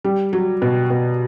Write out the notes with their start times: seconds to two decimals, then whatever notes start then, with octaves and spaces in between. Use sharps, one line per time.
0.04 G3
0.33 F#3
0.62 B2
0.90 B2